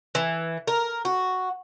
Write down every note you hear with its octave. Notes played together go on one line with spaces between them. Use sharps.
E3
A#4
F#4